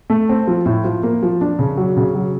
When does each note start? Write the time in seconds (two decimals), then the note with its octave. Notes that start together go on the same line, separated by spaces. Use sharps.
0.10 A3
0.29 C4
0.47 F3
0.66 A2
0.84 F3
1.03 A#3
1.23 F3
1.41 D4
1.59 C#3
1.77 F#3
1.97 C#3
2.15 F#3